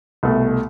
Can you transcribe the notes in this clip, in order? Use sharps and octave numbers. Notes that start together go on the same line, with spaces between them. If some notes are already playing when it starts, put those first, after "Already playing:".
C2 B2 A3